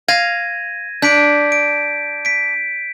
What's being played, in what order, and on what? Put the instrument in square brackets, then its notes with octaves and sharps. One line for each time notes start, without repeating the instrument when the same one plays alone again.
[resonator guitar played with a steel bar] F5 [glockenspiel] G#6 A#6 D#7
[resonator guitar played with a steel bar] D4 [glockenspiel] G6 B6 D7
[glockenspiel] D7
B6 D7